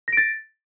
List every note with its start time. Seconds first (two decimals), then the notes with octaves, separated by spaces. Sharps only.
0.08 A#6
0.13 D7
0.17 A6